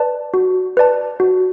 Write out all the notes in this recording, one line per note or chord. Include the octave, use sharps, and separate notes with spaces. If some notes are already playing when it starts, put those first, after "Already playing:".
Already playing: B4 D5 A5
F#4
B4 D5 A5
F#4